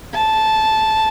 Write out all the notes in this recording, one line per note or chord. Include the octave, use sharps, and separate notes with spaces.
A5